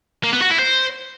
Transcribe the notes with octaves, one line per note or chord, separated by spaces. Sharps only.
A#3
B3
F#4
E4
C5